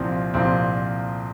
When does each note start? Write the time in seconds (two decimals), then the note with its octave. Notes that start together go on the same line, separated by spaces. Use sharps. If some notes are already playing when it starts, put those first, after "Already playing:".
Already playing: C2 A#2 F3 C4
0.34 C2 A#2 F3 C4